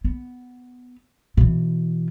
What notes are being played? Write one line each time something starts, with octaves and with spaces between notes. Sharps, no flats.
B3
B2 E3